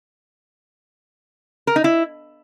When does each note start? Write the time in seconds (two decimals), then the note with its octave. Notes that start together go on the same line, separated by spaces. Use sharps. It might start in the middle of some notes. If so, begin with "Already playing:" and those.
1.67 A#4
1.76 D#4
1.84 E4